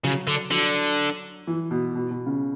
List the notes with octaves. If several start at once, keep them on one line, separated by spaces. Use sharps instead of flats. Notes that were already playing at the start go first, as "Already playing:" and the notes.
C#3 F#3
D3
D3 F#3
E3
B2
B2
B2
C#3